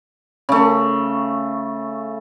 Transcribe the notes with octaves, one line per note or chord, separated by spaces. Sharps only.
C#3 A3